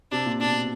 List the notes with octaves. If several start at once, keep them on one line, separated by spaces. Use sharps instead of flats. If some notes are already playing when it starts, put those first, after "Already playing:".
C3 D4
A#2
B2 D4